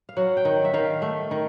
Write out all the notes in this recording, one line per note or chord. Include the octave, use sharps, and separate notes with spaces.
F5
F#3 F#5
G5
D#3 F#5
E5
D#3 F5
A3
D#3